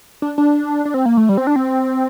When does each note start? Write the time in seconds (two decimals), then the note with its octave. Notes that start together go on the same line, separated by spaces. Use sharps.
0.22 D4
0.38 D4
0.85 D4
0.94 C4
1.06 A#3
1.17 A3
1.29 G3
1.37 C4
1.47 D4
1.56 C4